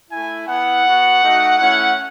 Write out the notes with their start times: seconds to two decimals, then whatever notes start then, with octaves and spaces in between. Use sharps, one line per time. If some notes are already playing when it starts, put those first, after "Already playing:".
0.10 A3 E4 G#5
0.47 B3 E4 F#5
0.84 B3 F#4
1.21 A3 D#4 F#4
1.58 A3 C#4 E4 F#5